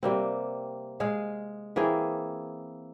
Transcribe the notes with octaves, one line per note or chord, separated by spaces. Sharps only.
C3 G3 A#3 C4
G#3 G#4 F5
E3 A#3 C4 G#4